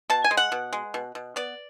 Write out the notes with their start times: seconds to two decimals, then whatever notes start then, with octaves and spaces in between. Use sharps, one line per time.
0.10 B2 A5
0.24 G#5
0.31 G#3
0.37 F#5
0.52 B2
0.73 G#3
0.94 B2
1.15 B2
1.36 B3 D5